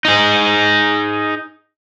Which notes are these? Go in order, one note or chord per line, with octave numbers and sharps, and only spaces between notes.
D#4 G#4